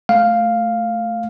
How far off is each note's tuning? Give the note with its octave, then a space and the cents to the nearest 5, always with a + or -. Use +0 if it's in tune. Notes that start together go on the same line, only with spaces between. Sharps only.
A3 +0 F5 +0